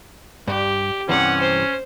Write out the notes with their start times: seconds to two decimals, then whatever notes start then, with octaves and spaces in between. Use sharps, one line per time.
0.47 G2 G4
1.09 G2 C3 E3 C#4 F#5
1.41 C5